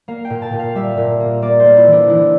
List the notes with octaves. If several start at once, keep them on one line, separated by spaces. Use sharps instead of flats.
A#3 F5
G5
A#2
A5
A#2
F5
G3 E5
A#2
A#3
A#3 D5
C5
A#3
E4
E3
D4
E3 E4